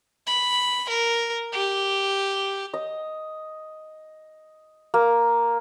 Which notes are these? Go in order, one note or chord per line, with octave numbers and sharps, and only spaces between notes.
B5
A#4
G4
D#5
A#3